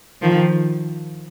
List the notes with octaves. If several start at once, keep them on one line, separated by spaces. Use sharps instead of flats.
D#3 F3